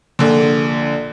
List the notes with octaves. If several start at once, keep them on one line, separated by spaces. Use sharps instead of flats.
A#1 D3